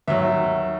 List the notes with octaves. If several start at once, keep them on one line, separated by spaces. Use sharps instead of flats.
D#2 D#3 F#3 E5